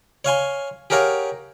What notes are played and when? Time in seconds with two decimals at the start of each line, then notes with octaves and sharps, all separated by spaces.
0.25 C#5 F5 G#5 C6
0.90 G4 G#4 A#4 C#5 F5 F#5